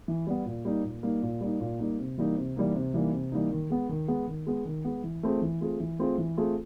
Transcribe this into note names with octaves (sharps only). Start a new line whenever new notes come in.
E3
G3 B3
A#2
G3 A#3 D#4
A#2
G3 A#3 D#4
A#2
G3 A#3 D#4
A#2
G3 A#3 D#4
C3
E3 G3 A#3 D#4
C3
E3 G3 A#3 D#4
C3
E3 G3 A#3 D#4
C3
E3 G3 A#3 D#4
D#3
G#3 B3
D#3
G#3 B3
D#3
G#3 B3
D#3
G#3 B3
E3
A3 C4 F4 G#4
E3
A3 C4 F4 G#4
E3
A3 C4 F4 G#4
E3
A3 C4 F4 G#4